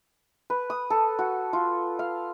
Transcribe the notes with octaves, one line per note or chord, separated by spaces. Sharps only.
B4
D#6
A4
F#4
F4
F5